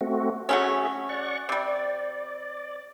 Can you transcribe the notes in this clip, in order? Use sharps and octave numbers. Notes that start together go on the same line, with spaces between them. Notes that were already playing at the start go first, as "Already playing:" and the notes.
A3 C4 F#4
F#3 A3 C#4 F#4 G#4 E5
D5 F#5 C#6
C3 G3 D5